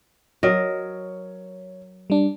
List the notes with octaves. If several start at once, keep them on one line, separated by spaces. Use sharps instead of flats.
F#3 A#4 C#5 D#5
G3 D4